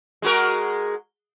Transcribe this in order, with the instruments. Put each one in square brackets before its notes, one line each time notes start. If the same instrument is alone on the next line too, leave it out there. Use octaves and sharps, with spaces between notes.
[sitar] G#3 F#4 A#4